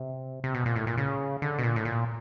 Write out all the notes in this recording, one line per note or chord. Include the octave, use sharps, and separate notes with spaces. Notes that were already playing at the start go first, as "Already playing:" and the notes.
Already playing: C3
C3
B2
A#2
A2
A#2
C#3
D3
B2
A#2
A2
A#2